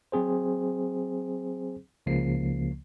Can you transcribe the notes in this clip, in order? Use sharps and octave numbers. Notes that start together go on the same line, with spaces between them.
F#3 C4 G#4 C5
C#2 C#3 F3 A#3 C7